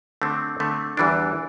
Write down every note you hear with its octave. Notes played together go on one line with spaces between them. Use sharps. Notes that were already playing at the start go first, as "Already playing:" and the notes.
D3 A3 C4
D3 A3 C4
E2 E3 G3 D4